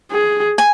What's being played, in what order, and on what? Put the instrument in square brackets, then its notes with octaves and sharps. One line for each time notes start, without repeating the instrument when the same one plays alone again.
[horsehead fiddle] G#4
[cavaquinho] G#5